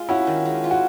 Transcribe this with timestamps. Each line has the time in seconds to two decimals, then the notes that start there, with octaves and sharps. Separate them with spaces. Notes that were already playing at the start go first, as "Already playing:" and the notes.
Already playing: G#3 F4
0.09 C#4 E4 F#4
0.27 D#3
0.45 G#3
0.64 F4
0.71 F#4